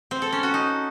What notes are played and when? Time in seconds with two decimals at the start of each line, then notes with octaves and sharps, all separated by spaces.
0.11 C4
0.22 A4
0.32 C#4
0.43 F#4
0.54 D#4